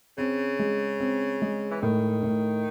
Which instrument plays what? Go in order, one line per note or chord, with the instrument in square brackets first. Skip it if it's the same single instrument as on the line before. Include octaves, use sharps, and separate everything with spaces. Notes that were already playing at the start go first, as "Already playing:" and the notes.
[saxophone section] C#3 [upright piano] C4
[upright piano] G#3
C4
G#3
[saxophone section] E3
[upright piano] A2 [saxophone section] D#3
[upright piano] A2